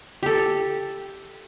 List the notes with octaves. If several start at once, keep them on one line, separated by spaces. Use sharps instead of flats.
G4 A4